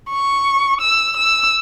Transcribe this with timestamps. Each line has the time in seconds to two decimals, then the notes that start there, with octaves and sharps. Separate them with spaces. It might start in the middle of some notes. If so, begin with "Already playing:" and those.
0.10 C#6
0.81 E6
1.16 E6